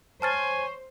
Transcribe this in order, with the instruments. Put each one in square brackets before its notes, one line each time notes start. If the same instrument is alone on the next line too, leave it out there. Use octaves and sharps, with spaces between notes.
[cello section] C5 [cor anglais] C#5 [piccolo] G#5 [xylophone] A5 F6 A6